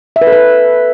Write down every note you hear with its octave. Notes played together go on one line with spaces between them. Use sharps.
E5
B4
A4
B4